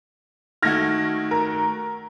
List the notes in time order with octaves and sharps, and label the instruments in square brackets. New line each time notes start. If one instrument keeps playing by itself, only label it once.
[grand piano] D#3 A3 F#4 [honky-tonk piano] F6 G#6 A#6
[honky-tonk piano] A#4